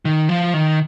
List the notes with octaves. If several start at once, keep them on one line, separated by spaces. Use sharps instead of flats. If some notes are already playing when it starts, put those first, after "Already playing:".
D#3
F3
D#3